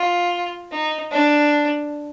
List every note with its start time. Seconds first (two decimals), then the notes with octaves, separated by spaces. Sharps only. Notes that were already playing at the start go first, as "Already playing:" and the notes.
Already playing: F4
0.72 D#4
1.11 D4